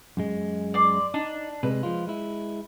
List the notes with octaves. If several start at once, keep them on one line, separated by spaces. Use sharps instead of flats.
F#2 G#3
D5 C6
D4 D#4
C3 G#3 B4
F3 G#3 F4
G#3 E4